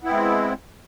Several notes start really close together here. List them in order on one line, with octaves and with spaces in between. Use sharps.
B3 E4 C4 G#3